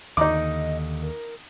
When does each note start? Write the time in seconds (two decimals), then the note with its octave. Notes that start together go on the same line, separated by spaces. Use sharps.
0.17 D#2 D3 D#4 D#5 A#5 D6
1.02 A#4